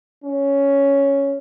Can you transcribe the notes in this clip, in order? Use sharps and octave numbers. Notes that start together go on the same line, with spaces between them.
C#4